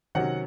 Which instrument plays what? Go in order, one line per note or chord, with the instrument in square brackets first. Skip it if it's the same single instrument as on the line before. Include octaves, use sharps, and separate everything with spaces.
[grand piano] C3 D#3 F#3 C#4 F#5